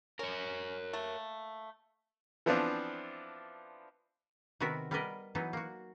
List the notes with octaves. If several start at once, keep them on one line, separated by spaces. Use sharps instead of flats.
C#4 A#4 C#5
A3 A#3
E3 F3 B3 C4 D4 F4
C3 D#3 B3 F#4 A#4 E5
G3 B3 A#4 B4 D5 D#5
E3 F#3 B3 D#4
A#3 F#4